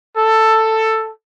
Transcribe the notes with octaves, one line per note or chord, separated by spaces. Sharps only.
A4